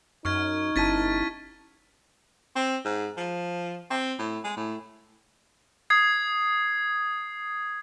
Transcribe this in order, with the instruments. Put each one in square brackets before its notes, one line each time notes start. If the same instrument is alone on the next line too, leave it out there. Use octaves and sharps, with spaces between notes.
[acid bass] F#2 [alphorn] D#4 [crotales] C#6 F6 G#6
[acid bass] G1 [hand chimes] C#4 E4 A5 [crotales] A6 B6 D#7
[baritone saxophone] C4
G#2
F3
C4
A2
G#3
A2
[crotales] D#6 G#6 C7